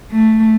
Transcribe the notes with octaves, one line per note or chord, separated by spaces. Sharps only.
A3